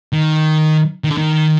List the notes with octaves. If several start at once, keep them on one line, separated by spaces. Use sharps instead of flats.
D#3
D#3
D3
D#3